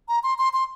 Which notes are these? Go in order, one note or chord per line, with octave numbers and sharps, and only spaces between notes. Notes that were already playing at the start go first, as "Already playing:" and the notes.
A#5
C6
C6
C6